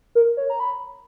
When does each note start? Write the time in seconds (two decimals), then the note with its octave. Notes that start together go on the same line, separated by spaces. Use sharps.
0.15 A#4
0.37 C#5
0.50 A#5
0.60 B5